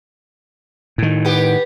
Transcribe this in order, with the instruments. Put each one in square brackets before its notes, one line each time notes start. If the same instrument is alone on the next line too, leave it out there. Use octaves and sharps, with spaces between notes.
[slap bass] A2 D#3
[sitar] B3 G4